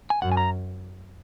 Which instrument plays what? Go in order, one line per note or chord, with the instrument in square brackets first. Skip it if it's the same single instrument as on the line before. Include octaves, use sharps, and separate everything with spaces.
[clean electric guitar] G#5
[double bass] F#2 [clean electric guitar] F#5
[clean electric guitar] G#5
A#5